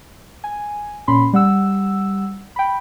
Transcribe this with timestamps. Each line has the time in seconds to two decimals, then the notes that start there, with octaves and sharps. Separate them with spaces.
0.44 G#5
1.08 A#2 C#4 B5 C6
1.33 G3 F#5 E6
2.56 G5 B5